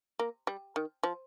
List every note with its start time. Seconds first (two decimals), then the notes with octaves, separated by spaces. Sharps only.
0.19 A#3
0.47 G3
0.76 D#3
1.03 F3